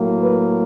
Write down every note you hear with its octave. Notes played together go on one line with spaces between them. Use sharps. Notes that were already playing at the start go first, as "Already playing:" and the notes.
Already playing: A2 F#3 A#3
B4